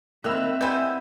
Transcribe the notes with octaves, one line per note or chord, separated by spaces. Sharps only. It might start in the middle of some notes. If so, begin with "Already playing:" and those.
D#3 A#3 C4 E5 B5 E6 F#6
G3 G#3 B3 E4 G#5 G6